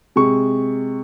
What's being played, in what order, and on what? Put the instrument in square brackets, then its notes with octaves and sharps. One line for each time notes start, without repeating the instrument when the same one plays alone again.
[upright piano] C3 G#3 C#6